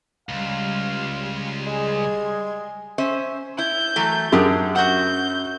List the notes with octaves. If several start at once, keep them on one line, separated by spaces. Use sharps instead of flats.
C#2 G3 F5 C6 G#6
G#3 G#4
C#4 C5 E5
E4 G6
E3 F#3 A3
F#2 D4 G4 G#4
F#4 F#5 G6